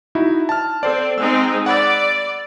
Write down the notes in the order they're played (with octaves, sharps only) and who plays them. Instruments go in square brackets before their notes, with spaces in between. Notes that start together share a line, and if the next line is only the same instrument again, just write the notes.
[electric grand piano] D#4 E4 F#4
A5 F6
[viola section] C4 [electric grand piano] A4 C5 D5
[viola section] G#3 C4 D#4 [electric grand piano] E6
[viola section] D5 [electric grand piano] F#5 B5 E6